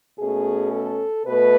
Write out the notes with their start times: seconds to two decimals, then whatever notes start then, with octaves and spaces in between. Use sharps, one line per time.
0.19 B2 A3 C#4 G#4
0.72 A4
1.26 B2 A3 B4